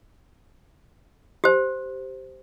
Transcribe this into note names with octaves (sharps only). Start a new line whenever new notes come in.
G4 C5